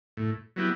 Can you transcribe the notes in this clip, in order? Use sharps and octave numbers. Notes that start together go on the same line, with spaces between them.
A2
F#3 B3 E4 G4